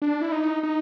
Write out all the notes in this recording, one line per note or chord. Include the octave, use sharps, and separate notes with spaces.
D4
E4
D#4
D#4